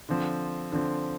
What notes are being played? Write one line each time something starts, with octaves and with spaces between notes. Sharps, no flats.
D3 F3 C4
D3 F3 C4